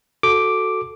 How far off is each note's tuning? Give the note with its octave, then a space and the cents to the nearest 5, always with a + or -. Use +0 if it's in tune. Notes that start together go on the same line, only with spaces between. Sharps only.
F#4 +0 A4 +0 D6 +0